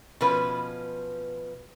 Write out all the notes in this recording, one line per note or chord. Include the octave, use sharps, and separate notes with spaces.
B2 F3 C#4 B4